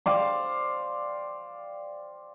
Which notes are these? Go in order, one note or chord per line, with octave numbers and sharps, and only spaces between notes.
C5 D5 F5 G5